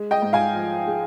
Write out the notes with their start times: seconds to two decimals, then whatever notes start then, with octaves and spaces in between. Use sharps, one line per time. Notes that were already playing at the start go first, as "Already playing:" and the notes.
Already playing: G#3
0.11 D#5 G5
0.22 G#2
0.33 F5 G#5
0.55 F3
0.87 G#3